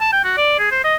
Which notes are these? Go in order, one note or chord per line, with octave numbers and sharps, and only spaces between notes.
A5
G5
F#4
D5
G#4
C5
D#5